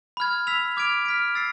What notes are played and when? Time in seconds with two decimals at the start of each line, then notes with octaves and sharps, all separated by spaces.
0.17 B5 F6 G#6
0.47 E6 B6 F7
0.77 D6 F6 G#6 D7 F7
1.06 F6 B6 D7
1.35 E6 A6 C7